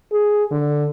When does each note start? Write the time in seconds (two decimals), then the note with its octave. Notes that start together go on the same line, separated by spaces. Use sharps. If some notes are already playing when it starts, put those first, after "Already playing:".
0.12 G#4
0.51 D3